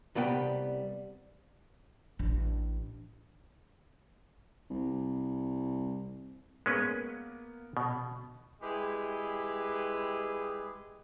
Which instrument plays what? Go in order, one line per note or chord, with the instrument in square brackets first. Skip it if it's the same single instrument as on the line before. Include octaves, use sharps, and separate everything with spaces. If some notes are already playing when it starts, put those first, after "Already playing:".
[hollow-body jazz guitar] C2 G3 B3 G5
[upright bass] A1 D4
[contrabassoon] C2
[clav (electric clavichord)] G#3 C#4 B4 [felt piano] A#3 B3
[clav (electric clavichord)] B2
[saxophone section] G3 G#3 E4 G4 G#4 B4